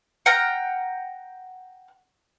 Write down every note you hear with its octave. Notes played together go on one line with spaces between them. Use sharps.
F#5 G5 A#5 F6